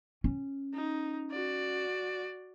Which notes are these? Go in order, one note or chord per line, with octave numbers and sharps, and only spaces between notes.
C#4
D#4
F#4 D5